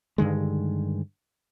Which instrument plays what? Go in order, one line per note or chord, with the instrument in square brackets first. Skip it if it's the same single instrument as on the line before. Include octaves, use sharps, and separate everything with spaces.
[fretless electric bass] G2 D3 D#3 G#3